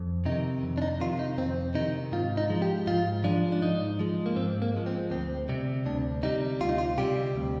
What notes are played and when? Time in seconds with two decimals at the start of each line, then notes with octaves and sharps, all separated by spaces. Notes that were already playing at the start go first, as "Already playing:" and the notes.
Already playing: F2
0.26 C3 D#3 D#4
0.63 F2
0.78 D4
0.82 D#4
1.00 C3 D#3 F4
1.19 D#4
1.38 F2 C4
1.75 C3 D#3 D#4
2.12 G#2 F4
2.37 D#4
2.50 F3 G#3
2.62 G4
2.87 G#2 F4
3.24 F3 G#3 D4
3.52 D4
3.62 G#2 D#4
3.99 F3 G#3
4.26 A#3
4.36 G#2 C4
4.62 A#3
4.74 F3 G#3
4.86 C4
5.11 D2 C4
5.49 C3 G3
5.86 D2 D4
6.23 C3 G3 D#4
6.60 D2 F4
6.69 D#4
6.78 F4
6.98 C3 G3 G4
7.35 D2